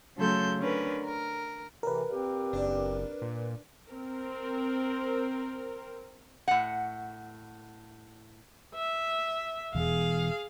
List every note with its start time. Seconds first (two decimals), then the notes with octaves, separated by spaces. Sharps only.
0.16 C#3 F#3 A3 A4 C6 G6
0.59 D3 C#4 A#4 B4
1.04 A#4
1.83 A2 C3 E3 A#4 B4
2.09 A#2 C4 G4
2.53 F#1 D4
3.22 A#2
3.88 C4 A#4
6.48 A2 F#5
8.75 E5
9.75 E1 E2 G#4 F5